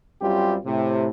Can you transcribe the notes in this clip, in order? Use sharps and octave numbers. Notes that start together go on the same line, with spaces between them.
F#2 G3 C4 F4 G4
A2 C3